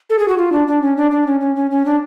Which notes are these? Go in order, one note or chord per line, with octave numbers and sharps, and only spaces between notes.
A4
G#4
F#4
F4
D4
D4
C#4
D4
D4
C#4
C#4
C#4
C#4
D4